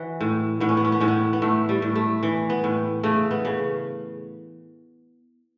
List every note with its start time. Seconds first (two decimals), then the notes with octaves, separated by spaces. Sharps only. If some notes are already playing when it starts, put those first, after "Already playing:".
Already playing: E3 F#4
0.21 A2
0.60 A2 B3
0.69 C#4
0.77 B3
0.84 C#4
0.92 B3
1.00 A2 C#4
1.08 B3
1.33 B3
1.42 A2 A3
1.69 G3
1.82 A2
1.96 A3
2.23 E3
2.50 B3
2.64 A2
3.03 C#3 A3
3.31 B3
3.45 C#3